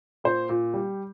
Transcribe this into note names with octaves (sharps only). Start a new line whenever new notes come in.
A#2 C5
A#2
G3